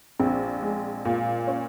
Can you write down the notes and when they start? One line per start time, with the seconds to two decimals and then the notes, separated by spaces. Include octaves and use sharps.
0.19 A#1 C4
0.62 G#3
1.05 A#2
1.47 C#4